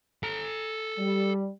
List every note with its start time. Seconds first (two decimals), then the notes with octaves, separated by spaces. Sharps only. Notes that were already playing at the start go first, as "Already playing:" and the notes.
0.23 A4 A#5
0.98 G3